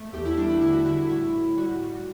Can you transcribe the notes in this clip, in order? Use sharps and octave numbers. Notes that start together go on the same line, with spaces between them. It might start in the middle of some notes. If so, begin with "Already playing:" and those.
Already playing: A3
E2 G4
E4
G3 D4
E4
D3 E4
F#4
D3 E4
A2 E4
A2
G3 F#4
G3